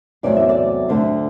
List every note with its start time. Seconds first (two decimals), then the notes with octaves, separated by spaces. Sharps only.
0.23 E2 C3 F#3 A3 D5
0.36 E5
0.49 D5
0.89 D2 D3 A3 C5